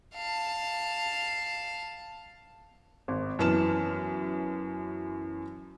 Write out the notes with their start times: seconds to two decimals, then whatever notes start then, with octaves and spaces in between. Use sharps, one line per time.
0.15 F5 A5
3.08 G#1
3.39 F#2 E3 B3 A5 F6 E7